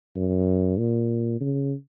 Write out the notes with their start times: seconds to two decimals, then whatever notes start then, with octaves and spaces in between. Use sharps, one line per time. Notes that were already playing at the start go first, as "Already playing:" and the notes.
0.16 F#2
0.78 A#2
1.40 C#3